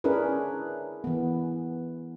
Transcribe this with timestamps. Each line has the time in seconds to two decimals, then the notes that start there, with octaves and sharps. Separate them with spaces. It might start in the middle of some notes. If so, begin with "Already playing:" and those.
0.04 C#4 D4 E4 G#4 A#4 B4
1.04 E3 B3